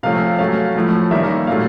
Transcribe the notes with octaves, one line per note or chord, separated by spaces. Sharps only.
C3 F3 A3 C#4 F5
F#3 A3 C#4 F5
A2 F3 A3
D#3 G3 A#3 C#4 E5
A#2 F#3 A3 F5